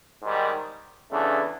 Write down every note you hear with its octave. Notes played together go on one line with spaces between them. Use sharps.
G#2 D#3 G3
E2 C#3 E3 A3 D4